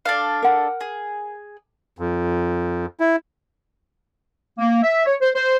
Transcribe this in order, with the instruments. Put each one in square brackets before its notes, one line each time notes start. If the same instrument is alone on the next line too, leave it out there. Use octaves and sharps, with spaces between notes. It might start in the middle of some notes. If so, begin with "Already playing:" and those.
[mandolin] D4 A4 F5
[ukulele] A#4 F#5
[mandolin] G#4
[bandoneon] F2
E4
[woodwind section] A#3
E5
C#5
C5
C5